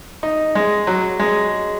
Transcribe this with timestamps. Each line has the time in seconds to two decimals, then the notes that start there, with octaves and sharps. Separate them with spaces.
0.23 D#4
0.55 G#3
0.87 F#3
1.19 G#3